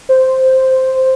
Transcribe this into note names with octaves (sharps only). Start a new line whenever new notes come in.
C5